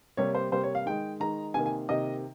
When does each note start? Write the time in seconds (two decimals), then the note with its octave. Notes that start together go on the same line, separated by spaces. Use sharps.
0.17 C3 G3 A#3 C#5
0.35 C5
0.52 C3 G3 A#3 C5
0.63 C#5
0.75 F5
0.86 D#3 G#3 G5
1.20 D#3 G#3 A#5
1.54 C3 D#3 A#3 G#5
1.66 G#5
1.89 C3 D#3 A#3 D#5